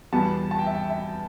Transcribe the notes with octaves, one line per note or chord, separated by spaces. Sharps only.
E2 B2 G3 B3 A5
A5
G5
E5
G5
E5